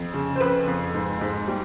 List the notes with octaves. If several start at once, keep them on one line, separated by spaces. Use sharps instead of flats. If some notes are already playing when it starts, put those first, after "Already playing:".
Already playing: F2
C#3
C5
F2 B4
F2
G#2
G#2
G3